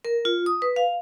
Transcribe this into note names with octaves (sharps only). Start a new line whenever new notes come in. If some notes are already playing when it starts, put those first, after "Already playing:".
A#4
F4
D#6
B4
F5